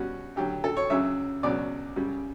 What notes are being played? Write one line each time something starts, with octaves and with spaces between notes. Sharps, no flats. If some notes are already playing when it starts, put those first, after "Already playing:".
Already playing: B2 G3 C#4 F#4
D2 D3 F#3 G4
A4
C#5
C#2 C#3 F#3 E5
C#2 B2 F#3 D5
F#2 C#3 G3